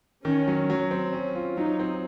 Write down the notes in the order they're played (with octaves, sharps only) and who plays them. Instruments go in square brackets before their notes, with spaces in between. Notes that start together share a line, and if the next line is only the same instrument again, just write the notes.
[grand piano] D#3 [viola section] C#4
[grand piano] F#3
F#3
C4
C#4
F4
[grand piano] F#3 [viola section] D#4
[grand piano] C4